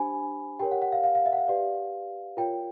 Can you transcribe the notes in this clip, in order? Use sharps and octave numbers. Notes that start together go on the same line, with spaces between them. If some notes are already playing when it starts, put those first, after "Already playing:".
Already playing: D4 G4 C5 G#5 B5
G4 A#4 C#5 G5
F#5
F#5
F5
F5
F5
E5
F#5
F5
G4 B4 D5
F4 A#4 C#5 G5